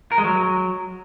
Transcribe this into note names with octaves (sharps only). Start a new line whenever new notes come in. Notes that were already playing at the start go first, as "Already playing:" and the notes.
A#4
G#3
F#3